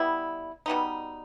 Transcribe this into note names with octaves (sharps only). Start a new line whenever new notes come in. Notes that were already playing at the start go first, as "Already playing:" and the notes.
Already playing: G3 B3 E4
B2 G3 B3 D#4